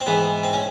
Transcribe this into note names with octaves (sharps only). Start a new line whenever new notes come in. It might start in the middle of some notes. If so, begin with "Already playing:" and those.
C4
G#2 E3 B3
C4
C#4